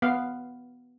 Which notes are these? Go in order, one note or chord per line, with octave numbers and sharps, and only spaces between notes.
B3 F5